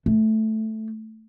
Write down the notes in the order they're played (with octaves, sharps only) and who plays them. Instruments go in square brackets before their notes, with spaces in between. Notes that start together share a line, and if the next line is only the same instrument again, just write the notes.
[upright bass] A3